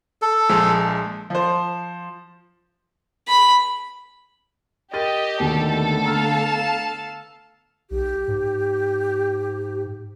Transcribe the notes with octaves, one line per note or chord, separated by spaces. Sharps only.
A4
A#1 F3 G#3
F3 C5
B5
G4 A#4 D#5 A6 D#7
D#2 B2 D3 D#3 A3 B3 A4
F5 A5 A#5 E6 F6
B1 G4
G#2